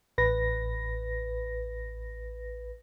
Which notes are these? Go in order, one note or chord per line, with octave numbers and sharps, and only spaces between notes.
A1 B4 A#6